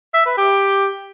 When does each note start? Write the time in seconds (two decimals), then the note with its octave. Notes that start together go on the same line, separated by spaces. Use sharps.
0.14 E5
0.26 B4
0.38 G4